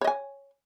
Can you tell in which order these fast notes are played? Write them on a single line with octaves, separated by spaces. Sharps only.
C#5 D#5 G#5